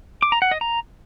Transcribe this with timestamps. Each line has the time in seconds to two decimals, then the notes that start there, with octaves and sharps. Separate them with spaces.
0.22 D6
0.32 A#5
0.42 F#5
0.51 D#5
0.61 A#5